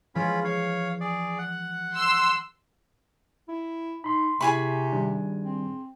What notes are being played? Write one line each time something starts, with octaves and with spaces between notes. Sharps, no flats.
E3 F3 G#3 C#4 F4 B5
C#5 F5
G#4 D5
F#5
C6 E6
E4
D#4 B5 C6
C3 E4 G#4 G#5 B5 C#6
D#3 G3 D4
C4